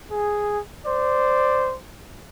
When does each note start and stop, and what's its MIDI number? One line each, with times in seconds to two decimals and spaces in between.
0.11 0.59 68
0.86 1.74 72
0.86 1.74 74